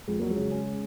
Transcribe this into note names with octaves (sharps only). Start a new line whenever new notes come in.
F2 G#3
F#3 A#3
C#3 G#3
C#4